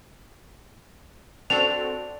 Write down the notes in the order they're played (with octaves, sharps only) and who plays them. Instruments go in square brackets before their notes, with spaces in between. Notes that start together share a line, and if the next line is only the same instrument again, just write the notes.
[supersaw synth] C4 F#4 A4 [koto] D4 [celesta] F7